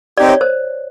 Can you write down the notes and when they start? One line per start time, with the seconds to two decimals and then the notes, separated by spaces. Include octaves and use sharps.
0.18 C4 D#4 G4 D5
0.29 C#5
0.41 C5